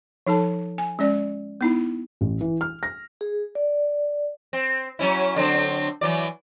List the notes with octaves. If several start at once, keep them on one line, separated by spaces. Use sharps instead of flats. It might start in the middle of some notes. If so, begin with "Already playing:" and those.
F3 D#4 A4 A5
G#5
G#3 C#4 D5
B3 D#4 E4
A1
E3
F6
A#6
G#4
D5
C4
F#3 C#4 E4
D3 F#3 C4
E3 F#3 D5